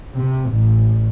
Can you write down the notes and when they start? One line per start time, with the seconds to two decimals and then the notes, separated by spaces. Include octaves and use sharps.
0.15 C3
0.50 A1